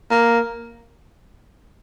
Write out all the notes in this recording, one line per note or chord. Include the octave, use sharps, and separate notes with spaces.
A#3